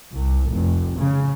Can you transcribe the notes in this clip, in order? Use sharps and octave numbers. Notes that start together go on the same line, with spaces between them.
C2
F1
C#3